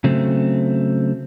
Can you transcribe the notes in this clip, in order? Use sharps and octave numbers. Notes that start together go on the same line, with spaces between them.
C#3 F#3 A3 C4